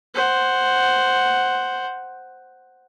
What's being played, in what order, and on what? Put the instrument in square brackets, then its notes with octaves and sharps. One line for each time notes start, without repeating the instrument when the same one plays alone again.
[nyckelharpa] C5 F#5